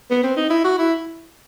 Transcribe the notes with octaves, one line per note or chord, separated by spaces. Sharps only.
B3
C4
D#4
E4
F#4
E4